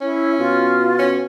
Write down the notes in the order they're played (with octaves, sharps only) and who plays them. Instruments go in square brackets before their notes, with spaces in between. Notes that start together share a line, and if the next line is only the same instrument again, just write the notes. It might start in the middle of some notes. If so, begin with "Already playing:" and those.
[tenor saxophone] C#4 [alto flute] E4
[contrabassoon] B2 [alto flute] F4
[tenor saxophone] C#4